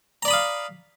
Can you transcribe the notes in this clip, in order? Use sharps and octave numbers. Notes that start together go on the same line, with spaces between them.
D5 F5 A#5 B5 D#6